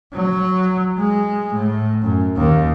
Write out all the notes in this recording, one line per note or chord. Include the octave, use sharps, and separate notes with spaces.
F#3
G#3
A2
F#2
D#2